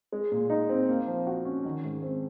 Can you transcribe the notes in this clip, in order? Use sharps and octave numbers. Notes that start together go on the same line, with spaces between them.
G#3
A#2
D#4
C4
A#3
F3
F#4
C#4
D#3
G#2
C4